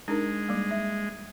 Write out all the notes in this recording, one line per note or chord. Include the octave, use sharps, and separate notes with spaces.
G#3 D4 D#4 A#4
G3 A#3
E5